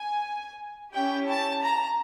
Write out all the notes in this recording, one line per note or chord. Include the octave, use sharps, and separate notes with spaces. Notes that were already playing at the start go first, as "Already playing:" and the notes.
Already playing: G#5
C#4 E4 G4 G5
A5
A#5